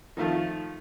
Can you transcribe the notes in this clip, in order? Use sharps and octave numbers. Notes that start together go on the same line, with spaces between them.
D#3 F3 A3 F4